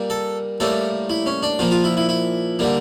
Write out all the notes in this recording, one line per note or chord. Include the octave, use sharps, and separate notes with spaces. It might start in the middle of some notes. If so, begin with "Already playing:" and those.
Already playing: A#2 G3 A#3
A4
A2 G3 A#3 A4
E4
C#4
D4
A#2 F3 A#3 F4
F4
E4
E4
E4
D3 G3 A#3